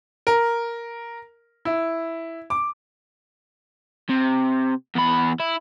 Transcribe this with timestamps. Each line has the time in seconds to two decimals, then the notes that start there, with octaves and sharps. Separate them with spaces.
0.27 A#4
1.65 E4
2.50 D6
4.10 C3
4.96 E2 B5
5.40 E4